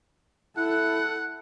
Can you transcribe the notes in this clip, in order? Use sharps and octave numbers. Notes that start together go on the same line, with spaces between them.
E4 A4 F#5 F#6